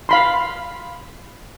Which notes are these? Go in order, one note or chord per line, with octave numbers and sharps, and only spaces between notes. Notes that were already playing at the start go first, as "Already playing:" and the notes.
F5 B5 C6